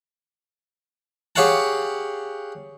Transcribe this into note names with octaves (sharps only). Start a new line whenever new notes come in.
G4 G#4 C#5 F5 F#5 A5